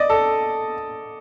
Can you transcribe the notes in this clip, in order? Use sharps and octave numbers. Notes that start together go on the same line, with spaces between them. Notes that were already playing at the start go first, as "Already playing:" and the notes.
Already playing: D5 D#5
A4